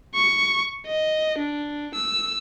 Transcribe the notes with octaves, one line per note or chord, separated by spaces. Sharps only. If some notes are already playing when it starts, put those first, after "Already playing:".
C#6
D#5
D4
E6